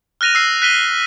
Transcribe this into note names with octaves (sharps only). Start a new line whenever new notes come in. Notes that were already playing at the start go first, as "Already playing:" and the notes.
F6 F#6 A#6 D#7 F7
E6 C7
F#6 B6 D#7 G7